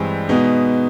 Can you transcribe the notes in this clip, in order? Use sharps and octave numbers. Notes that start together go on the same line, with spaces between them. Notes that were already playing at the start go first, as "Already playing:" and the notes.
Already playing: G2 E3 G#3 C4
B2 G#3 B3 D#4